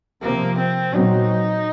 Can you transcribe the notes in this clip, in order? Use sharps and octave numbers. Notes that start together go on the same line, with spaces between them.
C3 F3 A#3 C4
C4
A#2 F#3 C4 D#4